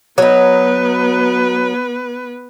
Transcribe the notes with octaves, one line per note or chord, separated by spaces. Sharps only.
F#3 B3 D#4 B4